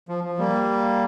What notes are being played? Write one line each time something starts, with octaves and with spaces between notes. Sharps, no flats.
F3
F3
G3 A#3